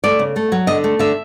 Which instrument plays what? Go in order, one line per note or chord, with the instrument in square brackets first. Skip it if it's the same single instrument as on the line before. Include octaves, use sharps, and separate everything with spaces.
[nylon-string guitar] A3 D5
C#3
A3
F#3
D3 D#5
A3
D3 E5